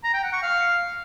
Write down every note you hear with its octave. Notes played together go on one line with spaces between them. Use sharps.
A#5
G5
F#5
C#6
F5